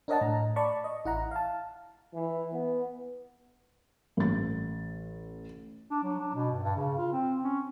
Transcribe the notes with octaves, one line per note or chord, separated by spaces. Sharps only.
D4 A#4 C#5 D#5 F#5 A5
A2 A#5
D5 A5 B5 C#6
D#5
A1 E4 F#5 A#5
F5 A5
E3
B3
A1 A6
D4
F#3
D4
B2
G2
G2
C#3
F4
C4
C#4